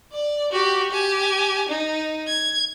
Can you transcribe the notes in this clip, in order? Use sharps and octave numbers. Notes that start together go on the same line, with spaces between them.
D5
F#4 G4
G4 G#5
D#4
G#6